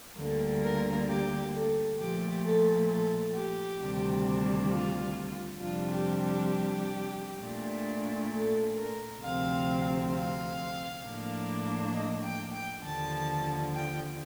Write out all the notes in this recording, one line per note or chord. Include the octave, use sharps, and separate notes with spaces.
D2 D3 G3 A#3 A4
A#4
G4
A4
A#2 F3 A3 G4
A4
A4
G4
D2 C3 D#3 G3 D4
F4
F2 C3 G3 D4 F4
G4
G4
A#2 A3 D4
A4
A#4
D2 C3 F3 C4 F5
F5
A2 F3 A#3 D4
D#5
G5
G5
D#2 D3 F3 A5
G5